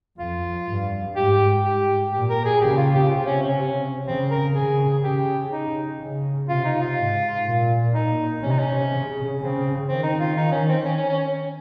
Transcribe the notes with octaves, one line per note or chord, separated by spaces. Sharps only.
F2 F4
G2
G#2 G4
G4
A#2 G4
A#4
G#4
C#3 G4
F4
G4
C3 F4
C#4
C#4
C#3 C4
A#4
C#3 G#4
C#3 G4
D#4
C#3
C3 F4
D#4
F4
G#2
A#2
D#4
C3 C#4
D#4
C#4
C#3
C#3 C4
D#3 C4
D#4
F4
D#4
C#4
C4
C#4
C#4
C#4